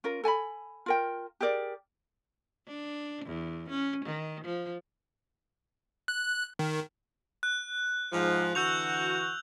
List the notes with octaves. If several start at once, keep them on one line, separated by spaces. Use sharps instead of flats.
C#4 F4 A#4
A4 G#5 A5 B5
F4 A#4 G5
G4 G#4 A#4 D5
D4
E2
C#4
D#3
F3
F#6
D#3
F#6
G#2 F3
D3 E3 F#4 E6 G6 F7